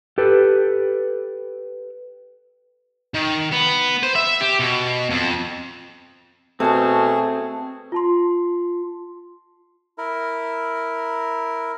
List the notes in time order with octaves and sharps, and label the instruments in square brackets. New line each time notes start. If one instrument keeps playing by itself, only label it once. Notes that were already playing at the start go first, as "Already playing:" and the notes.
[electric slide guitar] G4 A4 B4
[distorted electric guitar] D#3
B3
C5
E5
G4
B2
F2
[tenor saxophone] B2 [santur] A3 A5 [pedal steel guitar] C4 [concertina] G#4
[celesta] F4 A5 C6
[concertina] E4 A#4